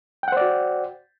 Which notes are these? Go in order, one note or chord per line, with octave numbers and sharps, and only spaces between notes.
F#4 C5 D5 F#5 G5